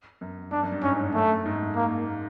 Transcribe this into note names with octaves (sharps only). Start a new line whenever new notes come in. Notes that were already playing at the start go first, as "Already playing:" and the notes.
F#2
G2 D4
F#2
G2
G#2 C#4
F#2 A3
G#2
A#3